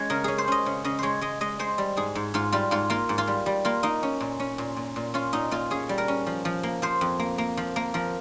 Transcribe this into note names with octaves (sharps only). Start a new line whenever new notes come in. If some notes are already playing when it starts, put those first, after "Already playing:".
Already playing: G#3 C#4 C#5
C#3 A#4
C#4 G#4
C5
C#4 D#5
C#3
C#3 D#5
G#3 C5 C#5
G#3 D#5
G#3 D#5
G#3 C5
G3
G#2 G#4
G#2
G#2 F4
G3 F4
G#2 F4
A#3 F4
G#2
F4
G3
G3
A#3 F4
A#3 D#4
C#4
A#2
C#4
A#2
A#2
A#2
C#4 F4
A#2 D#4
A#2 F4
C#4 G#4
G3
A#4
C#4
F3
F3
A#3
F3 C5
F2
A#3
A#3
F3
A#3
F3 A#4